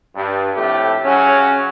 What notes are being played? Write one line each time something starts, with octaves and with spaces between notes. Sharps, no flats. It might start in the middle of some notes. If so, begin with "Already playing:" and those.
G2
F2 A2 A3 G4
C#3 F#3 C#4